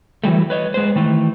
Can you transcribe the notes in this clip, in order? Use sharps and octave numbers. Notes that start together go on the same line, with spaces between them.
E3 F#3 G3 A3
B4 C#5 D#5
G#3 B4 C5
D#3 E3 A3